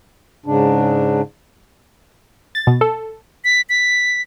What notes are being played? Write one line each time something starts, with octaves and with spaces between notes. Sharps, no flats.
G#2 C#3 D4
A6
B2
A4
B6
B6